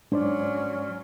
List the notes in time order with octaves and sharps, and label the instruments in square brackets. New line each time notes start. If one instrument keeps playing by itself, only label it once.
[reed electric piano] G#2 C5 D5 [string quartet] F#3 [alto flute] C#4 [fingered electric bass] D4